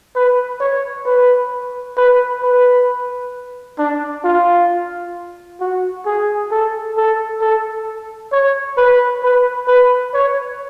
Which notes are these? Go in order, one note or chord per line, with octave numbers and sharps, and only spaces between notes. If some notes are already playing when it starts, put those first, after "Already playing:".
B4
C#5
B4
B4
B4
D4
F4
F#4
G#4
A4
A4
A4
C#5
B4
B4
B4
C#5